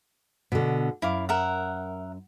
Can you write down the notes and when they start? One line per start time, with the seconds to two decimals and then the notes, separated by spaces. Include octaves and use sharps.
0.52 B2 D3
1.02 F#2 E4 F5 D6
1.29 A#4 E5 F#5